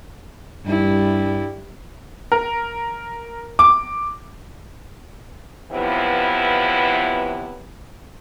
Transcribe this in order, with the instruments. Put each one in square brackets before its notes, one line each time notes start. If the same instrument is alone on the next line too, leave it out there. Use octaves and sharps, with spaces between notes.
[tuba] G2 [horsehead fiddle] G3 E4
[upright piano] A#4
D6
[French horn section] F#2 C3 E3 F3 B3 E4